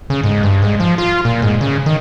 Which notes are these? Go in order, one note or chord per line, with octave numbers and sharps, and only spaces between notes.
C#3
G#2
G2
G#2
F3
F4
A#2
G#2
C#3
D#3